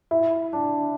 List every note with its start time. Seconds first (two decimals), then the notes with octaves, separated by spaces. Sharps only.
0.11 E4
0.53 D4